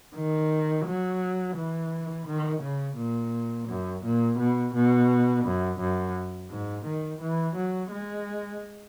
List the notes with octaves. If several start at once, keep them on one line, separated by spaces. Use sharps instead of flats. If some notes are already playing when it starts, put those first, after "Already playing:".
D#3
F#3
E3
D#3
C#3
A#2
F#2
A#2
B2
B2
F#2
F#2
G#2
D#3
E3
F#3
G#3